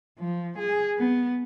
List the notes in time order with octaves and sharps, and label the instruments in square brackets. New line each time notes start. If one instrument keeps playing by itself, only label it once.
[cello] F3
G#4
B3